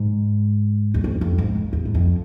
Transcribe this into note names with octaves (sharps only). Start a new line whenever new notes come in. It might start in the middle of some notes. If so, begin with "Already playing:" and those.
Already playing: G#2
E2
F2
F2
G#2
F2
E2
G#2
F2